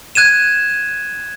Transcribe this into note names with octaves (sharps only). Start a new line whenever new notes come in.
F#6 G#6 D#7 E7